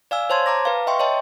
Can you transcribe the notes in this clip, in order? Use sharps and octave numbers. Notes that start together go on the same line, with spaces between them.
D5 F5 G#5 E6
C5 C#5 A5 C6 G#6
A5 A#5 D6 A#6
B4 F5
D#5 E5 G5 C6 C#6
C#5 D#5 E5 G5 A5